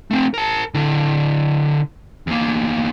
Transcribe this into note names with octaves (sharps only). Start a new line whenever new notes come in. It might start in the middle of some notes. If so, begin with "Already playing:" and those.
A3 C4
A#4 A5
D3 E4
E2 A#3